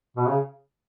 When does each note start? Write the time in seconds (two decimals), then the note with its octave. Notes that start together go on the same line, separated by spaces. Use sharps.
0.17 B2
0.27 C#3